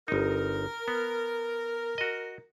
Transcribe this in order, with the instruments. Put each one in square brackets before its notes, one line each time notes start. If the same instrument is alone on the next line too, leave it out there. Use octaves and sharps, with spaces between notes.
[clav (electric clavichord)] G1 D#4 [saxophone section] A#4
[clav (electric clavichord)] B3
F#4 D#5